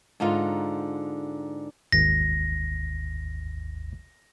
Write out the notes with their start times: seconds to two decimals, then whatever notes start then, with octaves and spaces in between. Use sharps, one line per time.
0.20 G#2 D3 D#4 F4
1.92 G#1 D#2 A#6